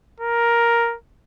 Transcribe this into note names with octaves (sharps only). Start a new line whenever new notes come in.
A#4